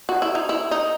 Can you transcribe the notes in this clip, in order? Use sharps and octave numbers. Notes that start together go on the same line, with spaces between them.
F#4
E4
D#4
E4
D#4